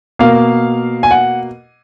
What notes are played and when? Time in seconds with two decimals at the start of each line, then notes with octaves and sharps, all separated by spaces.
0.19 B2 A#3 F5
1.03 G#5
1.11 F#5